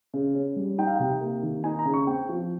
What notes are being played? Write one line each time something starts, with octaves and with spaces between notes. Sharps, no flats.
C#3
C#4
G3
D#4 G5
F5
C3 G5
A#3
D#3
D#4 G#5
A#5
C#3
C#6
C4 G5
F3